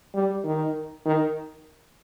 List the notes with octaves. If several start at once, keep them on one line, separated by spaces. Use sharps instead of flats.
G3
D#3
D#3